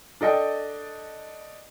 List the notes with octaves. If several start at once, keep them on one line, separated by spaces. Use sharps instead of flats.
D4 A4 D#5 G5